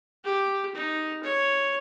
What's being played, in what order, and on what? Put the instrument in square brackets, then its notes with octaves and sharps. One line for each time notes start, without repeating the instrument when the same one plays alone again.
[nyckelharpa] G4
D#4
C#5